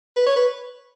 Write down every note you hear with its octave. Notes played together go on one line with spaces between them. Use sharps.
B4
C#5
B4